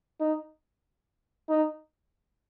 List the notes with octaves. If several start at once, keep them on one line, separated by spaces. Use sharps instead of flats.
D#4
D#4